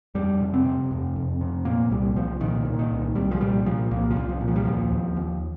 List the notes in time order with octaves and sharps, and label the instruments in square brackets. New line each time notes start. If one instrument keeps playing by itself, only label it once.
[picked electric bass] F2 G3
C3
C4
C3
F2
F2
C3
A#2 A#3
C2 G3
C2 F3
A#2 D#3
A#2
D#3
C2
C2 G3
F3
A#2 G3
A#2 F3
C2 A#3
F3
C2
F3
A#2
F3
G3
D#2 F3
D#2
D#2